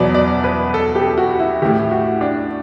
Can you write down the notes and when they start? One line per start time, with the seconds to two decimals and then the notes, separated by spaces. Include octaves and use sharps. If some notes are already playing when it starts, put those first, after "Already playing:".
Already playing: E2 B2 F#3 D5
0.15 D5
0.44 B4
0.74 A4
0.95 G4
1.18 F#4
1.40 E4
1.62 A2 E3 G4
1.91 F#4
2.21 D4